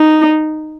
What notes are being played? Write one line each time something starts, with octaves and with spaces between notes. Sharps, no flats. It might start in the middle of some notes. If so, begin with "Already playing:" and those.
Already playing: D#4